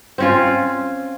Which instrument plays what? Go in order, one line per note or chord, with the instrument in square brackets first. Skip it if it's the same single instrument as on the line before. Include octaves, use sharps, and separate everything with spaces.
[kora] C4 C#4 F4